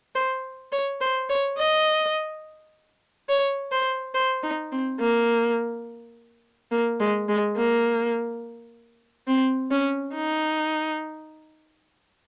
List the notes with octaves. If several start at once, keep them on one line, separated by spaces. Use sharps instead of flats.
C5
C#5
C5
C#5
D#5
C#5
C5
C5
D#4
C4
A#3
A#3
G#3
G#3
A#3
C4
C#4
D#4